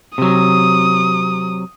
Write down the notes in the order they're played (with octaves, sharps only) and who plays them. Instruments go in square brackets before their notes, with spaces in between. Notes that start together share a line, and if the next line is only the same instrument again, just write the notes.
[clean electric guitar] C3 F#3 [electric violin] D#6